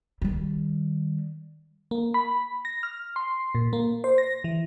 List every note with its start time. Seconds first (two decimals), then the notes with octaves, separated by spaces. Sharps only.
0.22 D#3 G3
1.91 A#3
2.14 B5
2.65 A#6
2.83 F6
3.16 C6
3.55 A#2
3.73 A#3
4.04 C5
4.18 A#6
4.44 E3